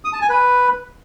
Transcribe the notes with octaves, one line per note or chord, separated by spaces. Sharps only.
D#6
A5
G#5
B4